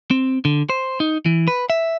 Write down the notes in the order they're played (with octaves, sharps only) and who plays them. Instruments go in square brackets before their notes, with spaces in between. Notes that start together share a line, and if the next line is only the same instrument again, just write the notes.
[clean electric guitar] C4
D3
C5
D#4
E3
B4
E5